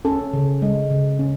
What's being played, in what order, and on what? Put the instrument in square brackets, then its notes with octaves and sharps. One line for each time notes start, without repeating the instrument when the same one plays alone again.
[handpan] C#4 A4
C#3
G#3
C#3
C#4